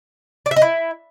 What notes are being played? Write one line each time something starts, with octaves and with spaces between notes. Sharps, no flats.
D5
E5
D#5
E4